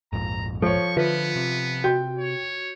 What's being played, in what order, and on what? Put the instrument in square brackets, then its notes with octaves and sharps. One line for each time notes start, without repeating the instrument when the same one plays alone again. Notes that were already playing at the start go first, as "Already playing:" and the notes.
[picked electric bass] A#1 F2 G#2 [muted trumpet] A#5
[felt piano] F3 C#5 [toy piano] A4 C5 [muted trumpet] C#6
[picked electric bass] D3 [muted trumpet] B3 [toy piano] F4 B4 E5
[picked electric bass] C3
[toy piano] F#4 [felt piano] G5 G6
[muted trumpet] C#5